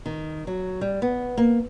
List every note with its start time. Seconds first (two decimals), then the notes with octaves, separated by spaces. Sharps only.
0.06 D#3
0.47 F#3
0.81 G3
1.02 B3
1.38 A#3